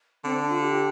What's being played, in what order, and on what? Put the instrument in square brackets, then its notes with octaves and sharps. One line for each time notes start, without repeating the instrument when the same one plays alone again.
[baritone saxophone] D3 [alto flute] C4
[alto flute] D4
F4
G4